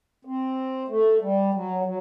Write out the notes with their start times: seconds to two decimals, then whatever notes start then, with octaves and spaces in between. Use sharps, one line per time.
0.25 C4
0.88 A3
1.21 G3
1.54 F#3
1.85 F#3